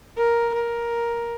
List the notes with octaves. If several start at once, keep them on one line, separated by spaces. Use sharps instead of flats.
A#4
A#4